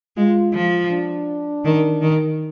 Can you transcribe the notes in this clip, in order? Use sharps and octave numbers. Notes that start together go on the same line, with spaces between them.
G#3 F4
F3
D4
D#3
D#3